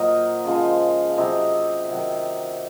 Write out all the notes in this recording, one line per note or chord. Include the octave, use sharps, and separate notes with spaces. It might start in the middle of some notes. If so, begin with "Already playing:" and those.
Already playing: A#2 F#3 A#4 C5 D#5
C#3 F3 G#3
F5
C3 F#3 C5 D#5
C3 D#3 F#3